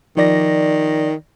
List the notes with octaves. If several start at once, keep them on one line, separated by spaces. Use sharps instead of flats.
D#3 F3 D5 A#6